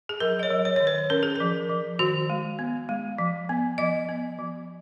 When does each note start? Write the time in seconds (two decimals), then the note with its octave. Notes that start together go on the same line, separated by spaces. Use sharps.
0.09 G#4
0.20 F#3 A#4
0.39 D#5
0.43 C#5
0.50 F#3
0.65 C#5
0.76 D#3 C#5
0.87 B4
1.10 C#4 A#4
1.23 G#4
1.36 F3 A#4
1.70 F3
1.99 D#3 F#4
2.30 G#3
2.59 B3
2.89 G#3
3.18 F3
3.49 B3
3.78 F3 D#5
4.09 B3
4.38 F3